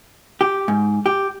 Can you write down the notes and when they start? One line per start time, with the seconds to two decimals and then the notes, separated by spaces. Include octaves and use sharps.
0.41 G4
0.68 G#2
1.06 G4